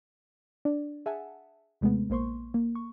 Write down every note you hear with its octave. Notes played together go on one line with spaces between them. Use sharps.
D4 D5
G#4 E5 F#5 G#5 A5
D#2 C3 G#3 A3 B3
A#1 A#3 C5 C6 C#6
A#3
C#6